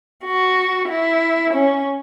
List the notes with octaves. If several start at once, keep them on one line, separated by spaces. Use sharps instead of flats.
F#4
E4
C#4